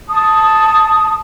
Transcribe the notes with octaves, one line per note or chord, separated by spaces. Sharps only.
A5 D#6